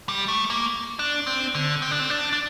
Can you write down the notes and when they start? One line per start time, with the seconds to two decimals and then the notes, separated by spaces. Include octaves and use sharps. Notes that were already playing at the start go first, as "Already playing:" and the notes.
0.09 G3
0.28 A3
0.50 A#3
0.99 D4
1.27 C4
1.55 D3
1.82 C4
1.91 D4
2.00 C4
2.10 D4
2.33 D4